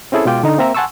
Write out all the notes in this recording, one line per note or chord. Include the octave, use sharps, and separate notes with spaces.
C4 C#4 E4 G#4 A4
B2 G#3 F4 G5 D6
D3 D#4
A#3 C4 A#4 E5 A#5
F#5 G#5 A5 C6 C#6 E6